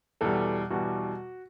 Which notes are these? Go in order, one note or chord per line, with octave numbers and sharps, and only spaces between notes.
E2 B2 G3 A4
E2 B2 G3 F#4